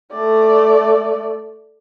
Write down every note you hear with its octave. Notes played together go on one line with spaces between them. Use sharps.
A3 D5